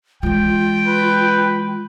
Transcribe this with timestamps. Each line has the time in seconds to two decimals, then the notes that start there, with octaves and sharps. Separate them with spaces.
0.23 E3 G#3 F4 G5
0.87 B4